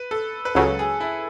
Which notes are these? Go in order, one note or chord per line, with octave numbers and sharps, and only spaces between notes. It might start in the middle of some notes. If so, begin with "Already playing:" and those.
Already playing: B4
A4
B4
C#2 C#3 F#3 A4
G#4
E4